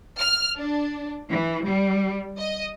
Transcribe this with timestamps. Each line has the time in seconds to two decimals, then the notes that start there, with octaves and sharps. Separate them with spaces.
0.18 F6
0.58 D4
1.30 E3
1.66 G3
2.38 D#5